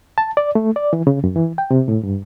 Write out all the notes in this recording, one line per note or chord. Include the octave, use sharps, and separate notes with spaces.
A5
D5
A3
D5
E3
C#3
F#2
E3
G5
C3
A2
G2